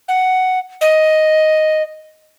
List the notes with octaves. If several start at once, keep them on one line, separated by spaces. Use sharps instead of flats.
F#5
D#5